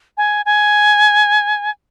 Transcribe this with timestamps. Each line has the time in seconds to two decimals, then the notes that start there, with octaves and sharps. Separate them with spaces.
0.17 G#5
0.46 G#5